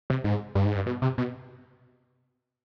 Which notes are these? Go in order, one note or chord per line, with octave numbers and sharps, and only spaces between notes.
C3
G#2
G2
G#2
G2
B2
C3
B2